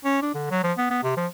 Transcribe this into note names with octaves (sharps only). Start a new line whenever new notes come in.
C#4
D4
D3
F#3
F3
B3
B3
C3
F3